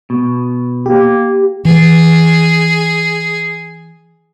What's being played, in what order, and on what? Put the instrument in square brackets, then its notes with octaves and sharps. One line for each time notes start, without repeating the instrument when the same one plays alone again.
[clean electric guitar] B2
[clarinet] A#3 [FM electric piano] G4
[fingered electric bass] E3 [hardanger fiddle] G#4